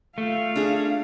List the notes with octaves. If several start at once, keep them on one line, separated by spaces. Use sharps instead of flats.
A3 F4 F5
D4 G#4